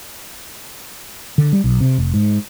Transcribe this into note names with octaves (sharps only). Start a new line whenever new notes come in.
D3
G3
B1
C3
F1
G#2